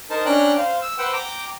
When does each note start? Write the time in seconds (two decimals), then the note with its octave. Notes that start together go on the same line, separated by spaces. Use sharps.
0.10 D#4 A#4 C5 A5
0.26 C#4 D4 G5 A#5 F6 F#6
0.58 C5 F5
0.82 E6
0.98 B4 C5 F#5 G5 E6
1.13 G5 A#5 D6